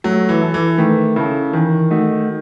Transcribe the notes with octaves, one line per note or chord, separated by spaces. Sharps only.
F#3 A3
E3
E4 A4
E3
D#3 A3
C#3 E4 A4
D#3 E3
A3 D#4 F#4